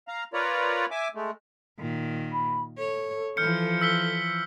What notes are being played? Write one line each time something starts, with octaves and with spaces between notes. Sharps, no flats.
F5 A#5
F4 A#4 B4 C#5 D5 A#5
E5 G#5 D6
G#3 A3
A#2 D#3
B5
A4 C#5
E3 F3 F6 G6 C#7
E6 B6 G7